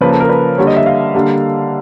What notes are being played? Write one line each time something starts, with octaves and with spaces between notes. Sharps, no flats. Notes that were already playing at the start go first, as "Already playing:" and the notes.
C#3 F3 A#3 B4
A4
A#4
B4
D3 G3 A#3 C#5
D#5
E5
F5
D3 G3 A#3